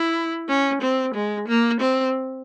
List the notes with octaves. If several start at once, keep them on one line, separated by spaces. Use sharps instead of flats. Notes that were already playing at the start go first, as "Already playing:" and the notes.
Already playing: E4
C#4
C4
G#3
A#3
C4